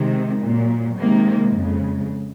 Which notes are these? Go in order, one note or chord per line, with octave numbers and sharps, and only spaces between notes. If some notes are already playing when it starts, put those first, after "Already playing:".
Already playing: C3 D#3 G#3
A#2 F#3
C3 D#3 G#3 A#3
F2 C#3 G#3